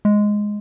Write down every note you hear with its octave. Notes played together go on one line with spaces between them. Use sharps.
G#3